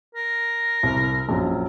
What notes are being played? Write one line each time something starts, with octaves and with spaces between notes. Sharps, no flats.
A#4
C2
A#1 F#2